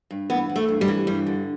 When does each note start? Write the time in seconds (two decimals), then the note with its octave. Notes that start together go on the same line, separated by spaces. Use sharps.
0.11 G2
0.30 E3 B3
0.49 E3
0.56 A3
0.68 G2
0.81 G3
0.88 E3
1.07 G2 G3
1.27 D3